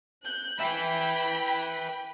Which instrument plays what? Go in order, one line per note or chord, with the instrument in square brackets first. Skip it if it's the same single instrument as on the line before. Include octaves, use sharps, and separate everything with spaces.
[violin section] F#6 G6
[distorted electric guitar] B4 E5 [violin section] G5 B5